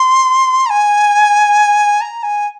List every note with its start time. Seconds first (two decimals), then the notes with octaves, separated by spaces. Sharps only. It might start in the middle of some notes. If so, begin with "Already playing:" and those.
Already playing: C6
0.66 A#5
0.70 G#5
2.01 A#5
2.23 G#5